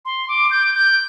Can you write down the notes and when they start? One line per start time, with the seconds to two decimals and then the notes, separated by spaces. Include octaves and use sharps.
0.05 C6
0.29 D6
0.51 G6
0.75 G6